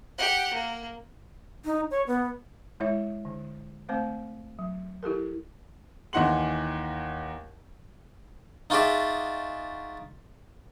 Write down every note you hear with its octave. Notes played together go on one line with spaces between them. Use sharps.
G4 F#5
A#3
D#4
C#5
B3
G#3 E4 C#5 E5
D3
A3 C4 C5 F5
F#3
E4 G4 A4 A#4
D#2 E3 D#4 F#5 C6 F#7
D#4 F4 F#4 G#4 D5 E5